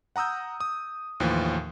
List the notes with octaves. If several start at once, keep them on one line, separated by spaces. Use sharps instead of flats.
F#5 A#5 D#6 E6 G6
D#6
D#2 A2 E3 F3